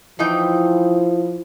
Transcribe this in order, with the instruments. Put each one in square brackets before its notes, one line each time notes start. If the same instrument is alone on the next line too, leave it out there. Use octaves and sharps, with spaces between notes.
[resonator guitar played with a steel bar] E3 D#4 G5 [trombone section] F3 [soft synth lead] E4